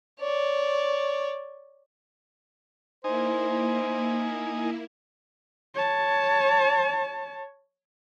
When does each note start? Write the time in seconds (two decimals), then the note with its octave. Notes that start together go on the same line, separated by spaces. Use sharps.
0.20 C#5 D5
3.04 A#3 D#4 E4 C5 G#5
5.75 C#5 A5